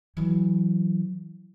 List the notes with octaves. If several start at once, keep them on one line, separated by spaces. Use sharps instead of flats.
E3 F#3